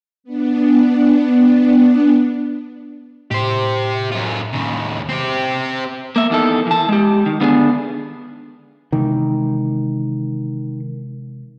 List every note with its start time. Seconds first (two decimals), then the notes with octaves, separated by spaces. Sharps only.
0.24 B3 D4
3.31 A2 G4 C5
4.12 F#2 F4
4.53 D#2 C#3
5.09 C4 G4
6.16 A#3 E5
6.30 E2 D#3 A4
6.67 E3 A5
6.89 G#3 G4
7.26 D#3
7.40 D3 B3 D4 G#4
8.92 C3 D#3 E3 G#3